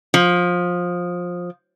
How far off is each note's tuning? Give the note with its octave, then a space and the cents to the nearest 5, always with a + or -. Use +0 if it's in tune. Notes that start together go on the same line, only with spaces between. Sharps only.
F3 +20